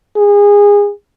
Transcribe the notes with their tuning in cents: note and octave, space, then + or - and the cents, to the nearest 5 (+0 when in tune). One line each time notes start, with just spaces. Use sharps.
G#4 -25